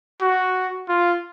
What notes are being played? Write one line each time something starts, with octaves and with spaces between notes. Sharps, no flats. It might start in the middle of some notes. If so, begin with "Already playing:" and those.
F#4
F4